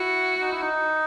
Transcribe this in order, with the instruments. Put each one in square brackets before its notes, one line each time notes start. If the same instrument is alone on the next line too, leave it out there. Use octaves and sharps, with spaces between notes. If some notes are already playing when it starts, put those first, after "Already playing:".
Already playing: [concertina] E4 [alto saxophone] F#4
[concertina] D#4
E4
D#4